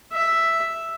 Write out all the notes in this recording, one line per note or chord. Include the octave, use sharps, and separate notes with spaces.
E5